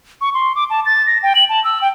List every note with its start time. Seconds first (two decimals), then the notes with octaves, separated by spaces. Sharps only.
0.21 C#6
0.34 C6
0.55 D6
0.70 A5
0.86 A6
1.07 A#6
1.23 G5
1.35 F#7
1.49 A5
1.64 E6
1.81 G5